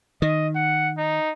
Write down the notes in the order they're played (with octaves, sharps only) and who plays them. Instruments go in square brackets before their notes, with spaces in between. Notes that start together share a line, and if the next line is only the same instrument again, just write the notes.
[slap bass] D#3 [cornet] D#5
[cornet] F#5
D#4